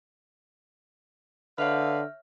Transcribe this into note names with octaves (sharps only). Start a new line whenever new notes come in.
D3 B4 C#5 E5 F5 F6